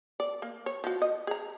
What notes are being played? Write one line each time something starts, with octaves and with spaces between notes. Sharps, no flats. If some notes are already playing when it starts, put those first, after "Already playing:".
D5
A#3
C#5
F3 F#4
D#5
G#4 A#5